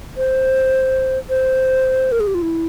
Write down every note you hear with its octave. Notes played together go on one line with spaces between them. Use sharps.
C5
C5
A#4
G#4
G4
F4
E4